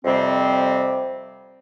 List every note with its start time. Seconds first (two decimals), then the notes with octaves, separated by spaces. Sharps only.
0.05 F2 C3 G3 C4